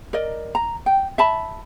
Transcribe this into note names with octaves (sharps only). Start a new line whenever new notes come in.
A#4 D5 D#5
A#5
G5
E5 A5 B5